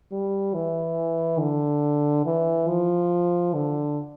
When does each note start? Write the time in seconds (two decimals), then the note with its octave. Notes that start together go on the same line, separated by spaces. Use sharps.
0.12 G3
0.54 E3
1.40 D3
2.26 E3
2.68 F3
3.54 D3